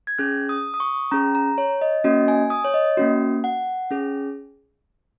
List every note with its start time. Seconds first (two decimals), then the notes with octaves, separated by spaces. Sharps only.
0.07 G#6
0.18 C#4 G#4 F#6
0.49 D#6
0.74 D#6
0.80 C#6
1.11 C#4 G#4 A#5
1.35 A#5
1.58 C#5
1.81 D#5
2.04 A#3 C#4 F#4 D#5
2.28 G#5
2.50 D#6
2.65 C#5
2.74 D#5
2.97 A#3 C#4 F#4
3.44 F#5
3.91 C#4 G#4